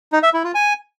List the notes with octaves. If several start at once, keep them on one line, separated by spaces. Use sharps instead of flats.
D#4
E5
E4
F4
G#5